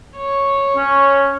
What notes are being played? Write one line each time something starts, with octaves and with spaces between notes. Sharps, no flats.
C#5
C#4